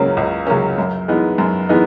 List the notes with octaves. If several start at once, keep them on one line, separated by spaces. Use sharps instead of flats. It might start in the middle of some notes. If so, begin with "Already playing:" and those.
Already playing: C#2 C#3 F#3 A#3 C#4
C#2
C#3 F#3 A#3 C#4
F#2
E3 G#3 B3 D#4
F#2
E3 G#3 B3 D#4